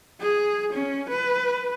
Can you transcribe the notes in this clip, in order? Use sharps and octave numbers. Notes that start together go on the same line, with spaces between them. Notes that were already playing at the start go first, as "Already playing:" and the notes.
G#4
C#4
B4